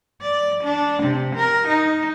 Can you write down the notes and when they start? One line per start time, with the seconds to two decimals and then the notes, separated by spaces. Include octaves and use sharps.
0.22 D5
0.64 D4
1.03 C3
1.35 A#4
1.68 D#4